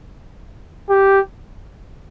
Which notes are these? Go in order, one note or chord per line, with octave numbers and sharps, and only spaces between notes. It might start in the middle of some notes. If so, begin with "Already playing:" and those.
G4